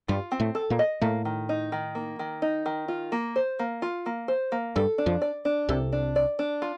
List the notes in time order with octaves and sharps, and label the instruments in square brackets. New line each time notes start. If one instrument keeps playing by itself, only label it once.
[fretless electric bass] G2 G3 [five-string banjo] F4
[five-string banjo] C4
[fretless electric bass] A2 A3
[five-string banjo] A4
[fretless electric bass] A#2 A#3
[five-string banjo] D#5
[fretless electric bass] A2 A3 [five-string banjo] A#3
[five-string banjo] D#3
D#4
D#3
A#3
D#3
D#4
D#3
F4
A#3
C5
A#3
F4
A#3
C5
A#3
[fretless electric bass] G2 G3 [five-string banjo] A4
[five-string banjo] D4
[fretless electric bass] F2 F3
[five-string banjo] D5
D4
[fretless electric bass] C2 C3 [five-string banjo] A4
[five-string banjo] D4
D5
D4
F4